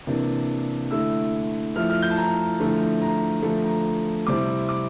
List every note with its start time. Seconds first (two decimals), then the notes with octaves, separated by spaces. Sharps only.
0.07 C3 E3 A#3 D4
0.91 D3 A3 E4 E6
1.76 F3 A3 E4 F6
1.89 F6
2.02 G6
2.10 A5
2.17 A#5
2.60 D3 F3 A3 E4
3.02 A#5
3.43 D3 F3 A3 A5
3.64 A#5
4.27 C3 G3 C4 E4 D6
4.69 D6